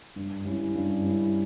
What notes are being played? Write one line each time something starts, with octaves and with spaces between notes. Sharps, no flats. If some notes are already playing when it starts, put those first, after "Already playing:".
G2
G3 C#4 E4
G2
G3 C#4 E4